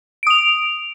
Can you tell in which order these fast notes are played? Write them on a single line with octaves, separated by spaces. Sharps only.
D7 D#6 F7